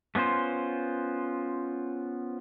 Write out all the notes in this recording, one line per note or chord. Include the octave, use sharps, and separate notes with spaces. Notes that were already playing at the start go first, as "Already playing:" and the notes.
A3 B3 C#4 F4 C5